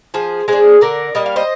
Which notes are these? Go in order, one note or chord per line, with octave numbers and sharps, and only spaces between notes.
F3 G#4 C5
G#3 D4 G#4 C5
D3 A#4 D5
G3 A#3 D#5
F5
C5 D#5